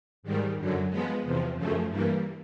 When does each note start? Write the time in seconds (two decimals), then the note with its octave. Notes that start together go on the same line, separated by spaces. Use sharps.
0.23 G#2 D#3 G3
0.56 F#2 D3 F#3
0.89 F3 G#3 B3
1.22 E2 C3 F3
1.55 F#2 C#3 F3 A3
1.88 G2 E3 G3 A#3